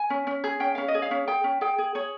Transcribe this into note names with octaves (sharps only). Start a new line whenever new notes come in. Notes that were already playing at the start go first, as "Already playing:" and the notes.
Already playing: G#5
C#4
C#4
G#4
C#4 G5
C#4 F5
D#5
G#4
F5
C#4
G#4 G5
C#4
G#4 G5
G#4
G#4 C#5